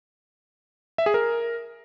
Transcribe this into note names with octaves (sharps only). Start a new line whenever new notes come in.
E5
G#4
A#4